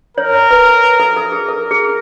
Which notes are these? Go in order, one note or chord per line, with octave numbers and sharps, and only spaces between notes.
A#4 C#5
B4
A4
A4
G#4
A4 A#4
G#4